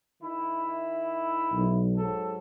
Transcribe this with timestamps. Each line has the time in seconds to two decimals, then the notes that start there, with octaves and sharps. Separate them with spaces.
0.22 D#3 E4
1.53 B1
1.96 G#2 F#3 A4